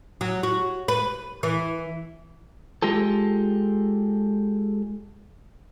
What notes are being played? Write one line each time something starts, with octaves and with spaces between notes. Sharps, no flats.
F#3
F#4
B4
E3
G#3 F4 G4 A4